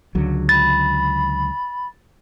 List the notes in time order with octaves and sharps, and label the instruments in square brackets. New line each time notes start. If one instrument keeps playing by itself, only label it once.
[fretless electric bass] C#2 D3 F#3
[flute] B5 [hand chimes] A6